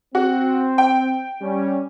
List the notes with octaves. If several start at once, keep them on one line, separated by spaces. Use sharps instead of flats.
C4 F#4
G5
G3 C#4